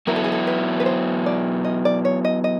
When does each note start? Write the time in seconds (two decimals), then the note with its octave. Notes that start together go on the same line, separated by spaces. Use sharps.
0.07 F#3 B3 E4 A#4
0.16 A4
0.24 G#4
0.32 A4
0.47 B4
0.80 B4
0.86 C5
1.26 D5
1.65 D#5
1.85 D5
2.05 C#5
2.25 D#5
2.44 D#5